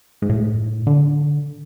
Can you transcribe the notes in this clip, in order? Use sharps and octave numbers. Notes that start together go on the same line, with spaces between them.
G#2
A2
D3